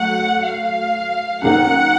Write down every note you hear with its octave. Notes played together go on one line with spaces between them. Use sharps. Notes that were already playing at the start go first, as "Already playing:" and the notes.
Already playing: F#3 A3 F#5
F5
F#2 D#3 A#3 D#4 A#4 F#5